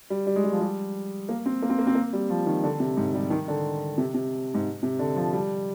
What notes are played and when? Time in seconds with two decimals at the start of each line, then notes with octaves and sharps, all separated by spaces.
0.10 G3
0.27 G3
0.36 G#3
0.44 G3
0.52 F3
0.61 G3
1.29 A#3
1.46 C4
1.62 A#3
1.70 C4
1.79 A#3
1.87 C4
1.95 A#3
2.13 G3
2.30 F3
2.46 D#3
2.64 D3
2.80 C3
2.97 G#2
3.14 G3
3.30 D#3
3.48 D3
3.98 C3
4.14 C3
4.54 G#2
4.83 C3
4.99 D3
5.16 F3
5.33 G3